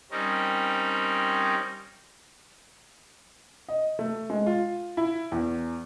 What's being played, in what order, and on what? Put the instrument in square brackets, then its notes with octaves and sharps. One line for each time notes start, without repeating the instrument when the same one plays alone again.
[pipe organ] G3 C4 C#4 D#4 A#4
[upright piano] D#5
A3
G#3
F4
E4
E2